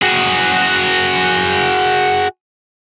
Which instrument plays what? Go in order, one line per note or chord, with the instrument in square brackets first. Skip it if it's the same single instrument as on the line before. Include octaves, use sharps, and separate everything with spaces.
[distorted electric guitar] F#4 G#4